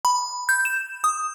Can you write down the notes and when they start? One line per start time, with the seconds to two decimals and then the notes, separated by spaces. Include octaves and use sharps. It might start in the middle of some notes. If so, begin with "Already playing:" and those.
0.05 B5
0.49 G6
0.65 E7
1.04 D#6